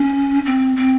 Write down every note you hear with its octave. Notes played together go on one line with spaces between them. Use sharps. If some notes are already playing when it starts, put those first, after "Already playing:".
Already playing: C#4
C4
C4